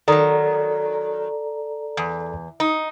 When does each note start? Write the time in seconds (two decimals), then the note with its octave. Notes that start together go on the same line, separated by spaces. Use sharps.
0.08 D#3 F#3 A4 D5 A#5
1.97 E2
2.60 D#4